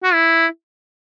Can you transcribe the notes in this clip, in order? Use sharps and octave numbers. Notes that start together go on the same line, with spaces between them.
F#4
E4